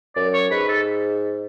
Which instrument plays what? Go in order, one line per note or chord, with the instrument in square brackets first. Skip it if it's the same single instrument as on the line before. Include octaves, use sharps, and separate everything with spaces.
[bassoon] F#2 [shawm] D5
[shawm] C#5
[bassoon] G#2 [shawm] B4
[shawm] A4